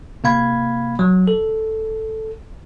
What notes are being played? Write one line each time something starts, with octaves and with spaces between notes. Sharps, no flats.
C3 A#3 F5 B5 G#6
F#3
A4